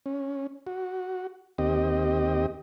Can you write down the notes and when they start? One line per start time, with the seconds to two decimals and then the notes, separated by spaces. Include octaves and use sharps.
0.06 C#4
0.67 F#4
1.58 D#2 C4 G4 D#5